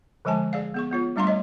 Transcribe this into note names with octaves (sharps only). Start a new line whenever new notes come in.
D3 F3 G#3 G#5 A5
G#4 D5 F5
B3 G#4 C#6
B3 F4 C#5
G3 A3 D4 F5 A#5 C6
C#5 D#5